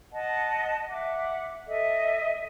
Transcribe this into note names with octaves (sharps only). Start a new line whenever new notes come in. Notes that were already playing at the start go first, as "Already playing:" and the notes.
D#5 F#5 A5
E5 F#5 D6
A4 D#5 E5